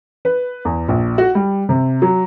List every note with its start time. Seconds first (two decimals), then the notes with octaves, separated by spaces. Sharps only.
0.25 B4
0.65 E2
0.88 A#1
1.18 F#4
1.35 G3
1.69 C3
2.02 F#3